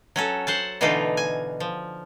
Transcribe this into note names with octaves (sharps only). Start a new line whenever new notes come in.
F#3 C#4 A4
C5 F#5 A5
B2 D3 E3 A3 D#4 F4
G#5
F3